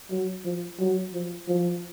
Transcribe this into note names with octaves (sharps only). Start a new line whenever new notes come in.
F#3
F3
F#3
F3
F3